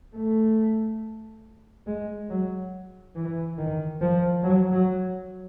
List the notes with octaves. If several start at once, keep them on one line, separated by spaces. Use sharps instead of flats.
A3
G#3
F#3
E3
D#3
F3
F#3
F#3